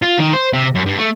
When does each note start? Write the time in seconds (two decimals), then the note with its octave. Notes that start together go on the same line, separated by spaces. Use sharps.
0.02 F4
0.18 D#3
0.33 C5
0.53 C3
0.75 F#2
0.86 G2
0.98 A3